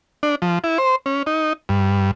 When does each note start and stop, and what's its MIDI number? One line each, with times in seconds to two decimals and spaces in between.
0.23 0.35 62
0.42 0.59 53
0.64 0.78 64
0.78 0.96 72
1.06 1.23 61
1.26 1.53 63
1.69 2.11 43